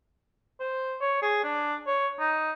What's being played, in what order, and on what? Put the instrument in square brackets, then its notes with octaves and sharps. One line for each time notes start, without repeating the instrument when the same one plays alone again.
[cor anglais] C5
C#5
G#4
D4
C#5
D#4